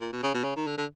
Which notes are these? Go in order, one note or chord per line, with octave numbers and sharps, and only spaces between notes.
A#2
B2
C#3
B2
C#3
D#3
D3
D3